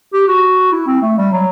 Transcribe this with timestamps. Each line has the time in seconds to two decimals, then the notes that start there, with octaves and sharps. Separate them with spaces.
0.13 G4
0.28 F#4
0.72 E4
0.87 C4
1.02 A3
1.18 G3
1.32 F#3